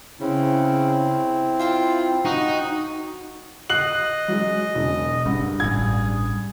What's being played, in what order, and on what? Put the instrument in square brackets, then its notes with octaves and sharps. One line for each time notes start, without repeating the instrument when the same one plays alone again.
[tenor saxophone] C#3 [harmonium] C4 E4
[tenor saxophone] F4 [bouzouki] C5 G5 A5
[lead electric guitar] D#4 [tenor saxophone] F#4
[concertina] D#5 [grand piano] F#6 C7 F#7
[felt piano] F#3 G#3
E1
[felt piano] G2 F#5 [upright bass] A3
[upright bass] A1 G3 [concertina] G#4 [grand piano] G#6